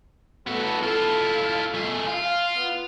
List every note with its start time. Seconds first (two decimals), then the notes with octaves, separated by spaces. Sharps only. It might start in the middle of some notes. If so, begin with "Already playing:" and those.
0.47 A1 B3 F#4 A4 B4
0.83 E4 F4 A4
1.74 A3 G#4
2.07 F4 F5
2.56 B3